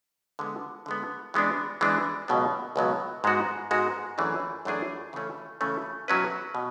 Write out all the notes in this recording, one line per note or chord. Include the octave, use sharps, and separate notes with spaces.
D3 G#3 B3
D3 G#3 B3
E3 G#3 B3 D4
E3 G#3 B3 D4
C#2 B2 F#3 B3
C#2 B2 F#3 B3
G#2 G#3 B3 F#4
G#2 G#3 B3 F#4
F#2 E3 A3 D4 G#4
F#2 E3 A3 D4 G#4
C#3 E3 A3 C#4
C#3 E3 A3 C#4
B2 F#3 C#4 E4 B4
B2